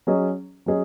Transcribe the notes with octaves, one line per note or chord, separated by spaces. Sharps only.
F#3 C#4 G#4 D#5
F#3 C#4 G#4 D#5